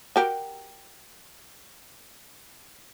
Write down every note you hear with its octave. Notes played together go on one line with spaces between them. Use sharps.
F#4 G4 A#4